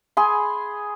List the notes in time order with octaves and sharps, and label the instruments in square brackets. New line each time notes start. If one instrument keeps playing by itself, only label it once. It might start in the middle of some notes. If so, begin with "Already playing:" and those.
[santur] G#4 G#5 B5 C6